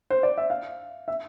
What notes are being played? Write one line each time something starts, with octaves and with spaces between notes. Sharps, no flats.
C5
D5
E5
F5
E5